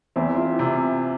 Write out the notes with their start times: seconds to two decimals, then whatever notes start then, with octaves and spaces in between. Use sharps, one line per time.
0.16 E2 C4 E4
0.36 F4
0.45 C4 E4
0.59 C3